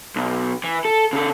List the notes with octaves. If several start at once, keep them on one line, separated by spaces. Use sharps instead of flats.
B1
E3
A4
C#3 A4